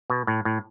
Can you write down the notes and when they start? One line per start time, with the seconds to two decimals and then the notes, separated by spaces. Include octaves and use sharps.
0.10 B2
0.27 A2
0.45 A2